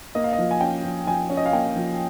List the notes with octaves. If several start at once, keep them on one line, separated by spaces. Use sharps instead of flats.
A#3 D#5
F5
D#5
F3
G#5
C#4 G5
F3
F3 G#5
C#4 C#5
D#5
F5
A#3 G5
F3